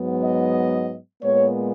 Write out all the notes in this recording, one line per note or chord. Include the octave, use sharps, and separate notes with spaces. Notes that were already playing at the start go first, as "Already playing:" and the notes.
Already playing: G#2 F#3 B3
D#5
A#2 G#3 B3 C#5